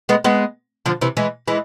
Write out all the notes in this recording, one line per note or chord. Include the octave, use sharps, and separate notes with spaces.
G#3 B3
G#3 B3
D3 F3
C3 E3
E3 G#3
E3 G#3